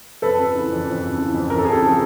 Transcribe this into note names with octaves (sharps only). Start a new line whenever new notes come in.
F2 A4 B4
C#3
E3
F2
F2
C#3
E3
F2
F2 A#4
A4
C#3 G#4
G4 A4
F3